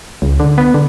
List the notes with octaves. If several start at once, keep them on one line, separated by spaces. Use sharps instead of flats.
C#2
D3
B3
D3